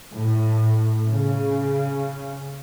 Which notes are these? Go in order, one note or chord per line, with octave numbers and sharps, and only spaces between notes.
A2
C#3